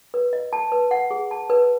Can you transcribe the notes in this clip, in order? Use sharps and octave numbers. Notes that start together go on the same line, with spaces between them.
B4
D#5
A5
B4
F#5
G#4
A5
B4